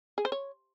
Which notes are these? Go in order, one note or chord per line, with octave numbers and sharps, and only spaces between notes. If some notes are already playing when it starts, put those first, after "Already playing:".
G#4
C5
C#5